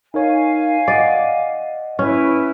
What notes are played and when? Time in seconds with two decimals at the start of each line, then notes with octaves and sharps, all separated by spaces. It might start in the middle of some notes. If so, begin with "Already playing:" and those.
0.14 D#4 A#4 C#5 F5 G#5
0.88 D5 D#5 F#5
1.99 C#4 E4 B4